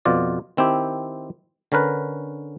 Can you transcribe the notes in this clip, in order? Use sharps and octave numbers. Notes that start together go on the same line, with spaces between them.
F2 B2 F4 D5
D#3 C4 E4 G4
D3 C#4 A#4 B4